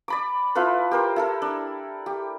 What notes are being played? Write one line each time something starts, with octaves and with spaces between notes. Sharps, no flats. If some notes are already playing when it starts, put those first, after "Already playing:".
D5 B5 D6
E4 F4 A4 B4
G4 A#4 C5
E4 A4 A#4
D4
G4